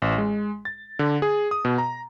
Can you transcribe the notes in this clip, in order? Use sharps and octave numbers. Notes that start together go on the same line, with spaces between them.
A1
G#3
A6
D3
G#4
D#6
B2
A#5